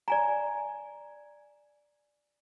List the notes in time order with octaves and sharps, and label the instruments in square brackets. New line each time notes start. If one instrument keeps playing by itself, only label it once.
[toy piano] D5 G#5 A#5